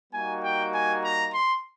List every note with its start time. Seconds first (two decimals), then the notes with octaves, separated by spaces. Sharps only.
0.12 G3 A#3 D#4 F#4 G#5
0.43 G5
0.72 G#5
1.04 A#5
1.33 C6